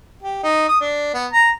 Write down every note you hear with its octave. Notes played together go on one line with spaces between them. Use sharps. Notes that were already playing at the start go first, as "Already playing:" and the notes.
G4
D#4
D#6
D4
B3
A#5